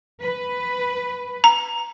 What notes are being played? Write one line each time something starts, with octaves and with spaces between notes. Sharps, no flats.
B4
A#5